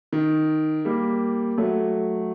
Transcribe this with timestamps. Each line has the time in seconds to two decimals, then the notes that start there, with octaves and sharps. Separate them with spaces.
0.13 D#3
0.85 G3 A#3
1.58 F#3 A3